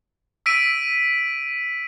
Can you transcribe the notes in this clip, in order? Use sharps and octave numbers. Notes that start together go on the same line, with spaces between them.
E6 B6 D7 D#7